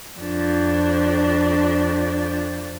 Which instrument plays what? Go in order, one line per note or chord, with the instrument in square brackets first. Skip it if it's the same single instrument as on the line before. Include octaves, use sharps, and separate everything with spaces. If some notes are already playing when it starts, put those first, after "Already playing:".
[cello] F2 D4